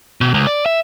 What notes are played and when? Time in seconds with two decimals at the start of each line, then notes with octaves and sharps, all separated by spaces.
0.21 B2
0.34 C#2
0.47 D5
0.66 E5